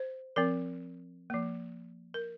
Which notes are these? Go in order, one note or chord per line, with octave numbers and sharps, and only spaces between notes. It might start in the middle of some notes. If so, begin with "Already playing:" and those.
Already playing: C5
F3 C4 A#4
F3 A#3
A#4